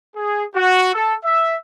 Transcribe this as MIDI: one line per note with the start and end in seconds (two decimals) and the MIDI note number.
0.16 0.44 68
0.56 0.93 66
0.94 1.14 69
1.24 1.55 76